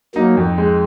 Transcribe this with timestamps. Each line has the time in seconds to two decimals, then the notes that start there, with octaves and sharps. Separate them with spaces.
0.16 F#3 A#3 D#4
0.37 F2
0.58 G#3